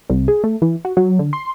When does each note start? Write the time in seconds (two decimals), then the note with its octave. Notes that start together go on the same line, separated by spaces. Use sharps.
0.10 C2
0.28 G#4
0.44 A3
0.62 E3
0.85 F#4
0.97 F#3
1.19 D3
1.33 C6